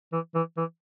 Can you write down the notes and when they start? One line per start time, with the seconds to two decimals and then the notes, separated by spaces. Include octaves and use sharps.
0.13 E3
0.35 E3
0.57 E3